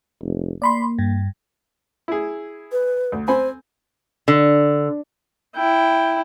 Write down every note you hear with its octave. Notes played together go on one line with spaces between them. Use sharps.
F1
A#3 D5 B5 C6
G2
E4 G#4
B4
D2
C4 C5 G#5 B5
D3
E4 G5